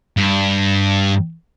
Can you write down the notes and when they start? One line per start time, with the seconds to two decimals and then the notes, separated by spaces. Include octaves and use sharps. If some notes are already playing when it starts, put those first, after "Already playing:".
0.17 G2